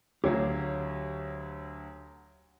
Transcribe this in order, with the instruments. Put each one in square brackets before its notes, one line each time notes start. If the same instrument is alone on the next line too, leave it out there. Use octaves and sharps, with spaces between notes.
[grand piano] D2 F#3 [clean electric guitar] G4 C#5 F5